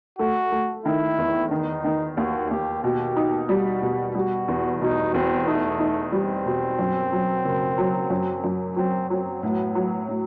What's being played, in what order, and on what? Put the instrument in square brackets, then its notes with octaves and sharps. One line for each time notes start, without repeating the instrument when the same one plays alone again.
[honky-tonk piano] A3 [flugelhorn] F#4
[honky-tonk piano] A3
[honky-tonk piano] D#3 [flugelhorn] E4
[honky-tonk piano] E2
[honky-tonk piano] D#3 [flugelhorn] D#4
[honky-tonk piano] D#3
[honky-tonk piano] D#2 [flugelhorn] F#4
[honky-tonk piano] D#2 [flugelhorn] G4
[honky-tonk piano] B2 [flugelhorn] G4
[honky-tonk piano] D#4
[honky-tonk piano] G3 [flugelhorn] F#4
[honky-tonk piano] B2
[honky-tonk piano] G3 [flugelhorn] F#4
[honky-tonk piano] E2
[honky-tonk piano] B2 [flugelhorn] D#4
[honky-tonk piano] E2 [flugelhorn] C4
[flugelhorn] A3 [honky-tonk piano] D#4
[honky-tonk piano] D#4
[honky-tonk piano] G3 [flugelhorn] C4
[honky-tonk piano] B2
F#2
F#3
F#1
F#3
F#2
F#2
[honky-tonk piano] F#3 [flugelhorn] C4
[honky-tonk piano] F#3 [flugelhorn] C4
[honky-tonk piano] A2 [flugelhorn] B3
[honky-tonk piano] F#3
A2